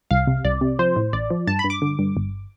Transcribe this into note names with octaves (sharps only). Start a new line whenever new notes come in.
C2 F5
C3
C2 D5
C3
F3 C5
A2
A1 D5
F3
G2 A5
B5
G2
D6
D3
G2
G1